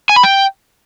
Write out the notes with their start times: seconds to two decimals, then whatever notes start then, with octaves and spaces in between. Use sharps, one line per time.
0.09 G#5
0.16 B5
0.23 G5